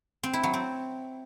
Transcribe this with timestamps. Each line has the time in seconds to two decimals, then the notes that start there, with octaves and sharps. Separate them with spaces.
0.23 C4
0.33 E4
0.43 F#3
0.54 C4